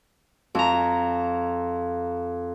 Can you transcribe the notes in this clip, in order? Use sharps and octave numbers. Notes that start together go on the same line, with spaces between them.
F2 A#5